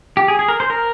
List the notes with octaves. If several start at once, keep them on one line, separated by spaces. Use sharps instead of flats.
G4
G#4
G#4
A#4
C5
A#4